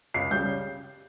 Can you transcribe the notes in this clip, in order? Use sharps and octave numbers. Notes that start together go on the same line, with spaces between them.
C#2 C7
C#3 G3 G6